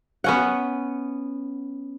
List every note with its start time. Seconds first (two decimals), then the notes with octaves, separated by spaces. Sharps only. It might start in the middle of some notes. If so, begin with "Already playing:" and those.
0.24 B3 C#4 F#5